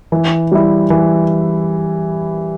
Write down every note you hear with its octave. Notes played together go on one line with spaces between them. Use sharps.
E3
G3 E4
E3